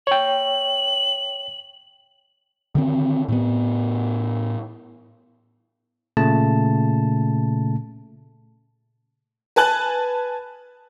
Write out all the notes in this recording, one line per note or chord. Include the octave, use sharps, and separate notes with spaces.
C#5 G5 F#7
D3 D#3 C4
A2 B3
A#2 C#3 A3 A5
B4 G#5 A5 F#6 F#7